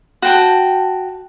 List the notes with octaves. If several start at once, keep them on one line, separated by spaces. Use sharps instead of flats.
F#4 G5 A5